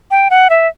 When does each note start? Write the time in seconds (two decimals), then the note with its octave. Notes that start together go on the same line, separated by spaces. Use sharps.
0.11 G5
0.30 F#5
0.50 E5